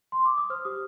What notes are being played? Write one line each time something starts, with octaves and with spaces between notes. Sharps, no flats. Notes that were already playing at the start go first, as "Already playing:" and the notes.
C6
D6
D#6
C5 F6
G4 D#6